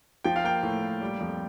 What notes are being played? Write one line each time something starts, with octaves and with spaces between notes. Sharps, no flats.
F3 G5
F5
A#3 G5
A2
A#3
G3
F2